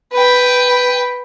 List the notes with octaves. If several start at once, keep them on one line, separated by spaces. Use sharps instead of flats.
B4 G5